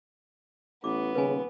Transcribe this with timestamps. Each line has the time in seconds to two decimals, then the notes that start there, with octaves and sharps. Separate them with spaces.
0.84 A1 B3 D6
1.15 D#1 C#3 B4 G#5